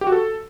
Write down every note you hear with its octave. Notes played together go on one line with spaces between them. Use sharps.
G4
F#4
A4